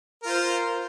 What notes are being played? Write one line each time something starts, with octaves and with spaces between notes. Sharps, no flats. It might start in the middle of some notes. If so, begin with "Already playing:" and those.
F4 A#4 C5